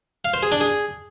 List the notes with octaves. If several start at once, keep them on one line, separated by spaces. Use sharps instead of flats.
F5
C5
G#4
D4
G#4